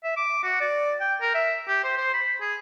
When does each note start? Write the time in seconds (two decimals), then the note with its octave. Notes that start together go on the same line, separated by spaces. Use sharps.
0.04 E5
0.17 D6
0.43 F#4
0.61 D5
1.00 G5
1.21 A#4
1.35 E5
1.68 G4
1.84 C5
1.98 C5
2.14 B5
2.41 G#4